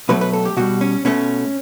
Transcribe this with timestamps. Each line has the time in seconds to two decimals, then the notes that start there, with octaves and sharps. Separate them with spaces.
0.09 B2 F#3 A3 B4
0.21 B4
0.33 A4
0.45 G4
0.57 B2 G3 F#4
0.81 C#4
1.05 B2 A3 C#4